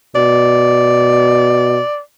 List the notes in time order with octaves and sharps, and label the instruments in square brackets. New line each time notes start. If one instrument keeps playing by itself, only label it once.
[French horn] B2 [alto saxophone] D5